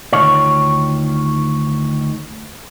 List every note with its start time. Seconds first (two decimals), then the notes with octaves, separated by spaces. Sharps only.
0.13 D2 D#3 F4 C#5